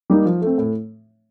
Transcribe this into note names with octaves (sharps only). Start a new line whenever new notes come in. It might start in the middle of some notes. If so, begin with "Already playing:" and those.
G3 A#3 D#4
F3
A3 C4
A2